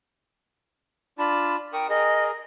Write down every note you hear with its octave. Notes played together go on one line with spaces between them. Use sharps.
D4 F4 A5 B5
A#4 G5 C#6 D#6
G#4 A#4 D#5